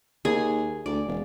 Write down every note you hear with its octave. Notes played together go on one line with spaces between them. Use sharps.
D#2 G#4
D2 D5
E1